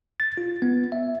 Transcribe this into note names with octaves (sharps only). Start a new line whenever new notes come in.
A6
F4
B3
E5